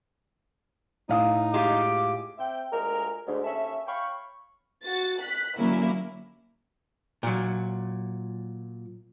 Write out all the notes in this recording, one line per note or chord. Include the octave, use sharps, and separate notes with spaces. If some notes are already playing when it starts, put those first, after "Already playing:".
A2 D#4 F5 D#6
G#3 F4 G4 D6
C4 E5 G5
D2 A#2 G#3 A#4
D2 G#2
D#2 C#4 A4 E5
C#5 F5 G5 B5 C#6
F#4 A6
F#6 B6
D3 F#3 A#3 C#4 E4
A#2 F#3